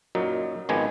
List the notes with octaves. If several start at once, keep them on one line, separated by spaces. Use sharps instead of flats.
F#2 A#2 F#3 D#4
G#1 D#3 F3 G#3 B3 G#5